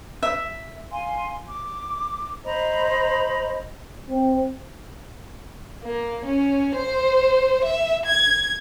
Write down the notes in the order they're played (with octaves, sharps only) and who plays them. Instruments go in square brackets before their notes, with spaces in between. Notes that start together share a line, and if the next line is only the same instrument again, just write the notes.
[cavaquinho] E5
[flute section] F5 G#5 C6
D6
C5 D#5 A#5 B5
[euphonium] C4
[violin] A#3
C#4
C5
E5
G#6